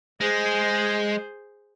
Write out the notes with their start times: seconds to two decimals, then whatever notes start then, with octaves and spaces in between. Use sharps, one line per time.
0.21 G#3 G#4 C5